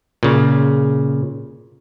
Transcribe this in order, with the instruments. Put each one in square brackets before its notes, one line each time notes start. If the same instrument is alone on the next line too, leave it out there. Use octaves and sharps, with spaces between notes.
[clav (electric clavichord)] A#2 C#3